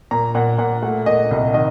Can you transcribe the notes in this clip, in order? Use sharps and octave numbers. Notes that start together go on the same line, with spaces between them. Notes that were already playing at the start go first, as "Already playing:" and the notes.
A#2 A#5
A#2 F#5
A#2 F#5
A3 F#5
A#2 D#5
C2 D#5
D#3 D#5